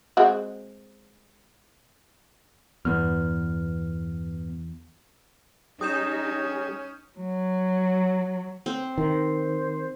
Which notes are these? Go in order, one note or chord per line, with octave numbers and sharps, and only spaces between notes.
G#3 C4 F#4
E2 G2 B3 F6
G3 C#4 D#4 G4 G#4 D#6 G6 E7
F#3
C4
D#3 C5